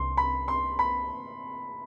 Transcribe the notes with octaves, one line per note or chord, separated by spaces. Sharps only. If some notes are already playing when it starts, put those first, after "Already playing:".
Already playing: C2 C6
B5
C6
B5